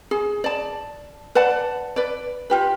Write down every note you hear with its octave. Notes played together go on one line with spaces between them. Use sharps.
G#4
D5 A5
B4 D5 F#5 A5
B4 D5
F4 G4 B4